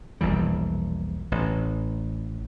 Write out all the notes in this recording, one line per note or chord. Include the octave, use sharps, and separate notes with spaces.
E1 A#1 E3 G3
A1